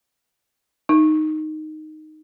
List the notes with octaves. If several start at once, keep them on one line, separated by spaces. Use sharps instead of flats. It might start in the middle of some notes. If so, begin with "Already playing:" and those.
D#4